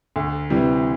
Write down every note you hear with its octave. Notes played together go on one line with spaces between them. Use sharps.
D2
C3 E3 G3